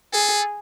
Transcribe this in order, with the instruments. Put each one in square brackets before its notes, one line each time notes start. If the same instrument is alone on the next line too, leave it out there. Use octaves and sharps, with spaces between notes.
[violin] G#4 [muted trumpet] A4